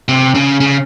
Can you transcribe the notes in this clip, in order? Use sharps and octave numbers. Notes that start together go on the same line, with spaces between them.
C3
C#3
C#3